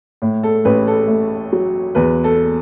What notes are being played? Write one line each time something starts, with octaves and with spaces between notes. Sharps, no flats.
A2
A4
A1 B4
A4
A3
F#3
E2 B4
A4